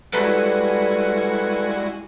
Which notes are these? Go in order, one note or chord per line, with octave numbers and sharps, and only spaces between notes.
G3 G#3 E4 F#4 A4 B4 F#5 G#5